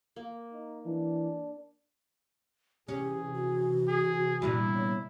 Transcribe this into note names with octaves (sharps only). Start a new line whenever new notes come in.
A#3
D#4
E3 D4
C3 E3 C#4 G4 G#4
F#4
G#4
G2 A#2 B3 E4
C#5